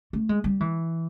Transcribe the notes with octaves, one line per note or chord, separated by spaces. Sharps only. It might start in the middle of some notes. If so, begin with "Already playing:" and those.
A3
G#3
G3
E3